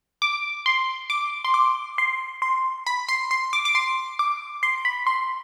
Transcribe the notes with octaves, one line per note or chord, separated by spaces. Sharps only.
D6
C6
D6
C6
D6
C6
C6
B5
C6
C6
D6
D6
C6
D6
C6
B5
C6